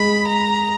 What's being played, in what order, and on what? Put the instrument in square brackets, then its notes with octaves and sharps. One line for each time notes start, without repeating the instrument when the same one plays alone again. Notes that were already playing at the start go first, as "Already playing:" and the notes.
Already playing: [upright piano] G#3 [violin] B5
[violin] A#5